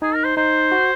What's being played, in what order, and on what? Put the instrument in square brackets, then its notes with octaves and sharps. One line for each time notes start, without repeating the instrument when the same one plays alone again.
[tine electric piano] D#4 [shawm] G#4
[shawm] A#4
C5
[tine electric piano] D#4 [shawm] C5
[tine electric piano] F#4